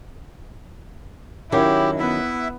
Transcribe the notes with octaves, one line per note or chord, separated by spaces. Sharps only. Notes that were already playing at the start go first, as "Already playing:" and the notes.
D#3 F#3 C#4 E4 G4
B3 E4 E5